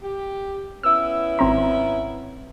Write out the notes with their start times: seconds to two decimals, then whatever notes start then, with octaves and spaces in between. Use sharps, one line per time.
0.03 G4
0.83 B3 C#4 E4 E6
1.39 G#1 C4 A#5